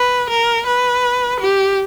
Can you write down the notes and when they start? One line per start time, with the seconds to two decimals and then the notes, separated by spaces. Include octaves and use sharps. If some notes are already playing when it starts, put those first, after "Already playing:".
Already playing: B4
0.30 A#4
0.66 B4
1.41 G4